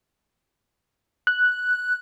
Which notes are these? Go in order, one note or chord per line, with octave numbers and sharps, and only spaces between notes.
F#6